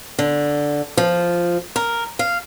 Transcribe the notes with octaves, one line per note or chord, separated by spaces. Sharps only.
D3
F3
A#4
F5